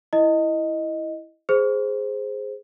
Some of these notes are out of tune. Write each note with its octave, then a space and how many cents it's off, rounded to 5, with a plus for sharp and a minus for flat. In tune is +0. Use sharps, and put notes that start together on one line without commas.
E4 +0 D#5 +0
G#4 +0 C5 +0